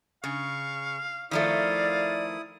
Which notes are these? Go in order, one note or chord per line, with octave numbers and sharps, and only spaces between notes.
C#3 F5 C#6
D#3 F3 A3 E4 D5 F5 D#6